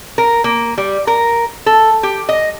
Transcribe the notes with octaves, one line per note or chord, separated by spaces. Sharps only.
A#4
A#3
G3
A#4
A4
G4
D#5